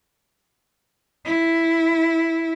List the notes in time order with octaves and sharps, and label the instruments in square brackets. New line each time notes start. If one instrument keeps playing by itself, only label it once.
[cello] E4